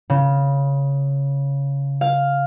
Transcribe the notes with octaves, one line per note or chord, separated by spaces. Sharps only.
C#3
F5